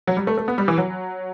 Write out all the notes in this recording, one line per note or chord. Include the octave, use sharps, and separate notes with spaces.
F#3
G3
A3
A3
B3
G3
E3
F#3